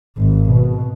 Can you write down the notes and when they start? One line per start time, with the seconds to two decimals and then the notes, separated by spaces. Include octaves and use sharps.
0.18 G#1
0.50 B2